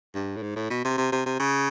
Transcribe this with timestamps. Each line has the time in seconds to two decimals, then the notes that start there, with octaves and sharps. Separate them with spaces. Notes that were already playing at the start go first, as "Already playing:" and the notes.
0.15 G2
0.36 A2
0.42 G#2
0.56 A2
0.70 B2
0.85 C3
0.98 C3
1.12 C3
1.26 C3
1.40 C#3